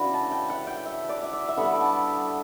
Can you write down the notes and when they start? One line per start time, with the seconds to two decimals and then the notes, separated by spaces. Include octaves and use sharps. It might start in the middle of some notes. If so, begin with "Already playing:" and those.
Already playing: C#3 E3 B3 D4 E4 F#4 B5
0.14 A5
0.32 G5
0.50 F#5
0.67 G5
0.77 F#5
0.86 E5
1.09 D5
1.23 E5
1.33 D5
1.48 E5
1.57 D3 G3 B3 F#5
1.75 B5
1.81 A5